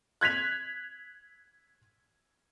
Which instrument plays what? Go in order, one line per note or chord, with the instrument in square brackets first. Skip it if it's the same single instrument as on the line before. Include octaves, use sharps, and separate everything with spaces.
[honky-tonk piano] F#6 G#6 B6 F7